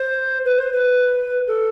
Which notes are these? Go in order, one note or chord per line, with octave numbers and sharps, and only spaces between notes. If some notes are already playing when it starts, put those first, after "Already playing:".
Already playing: C5
B4
C5
B4
A4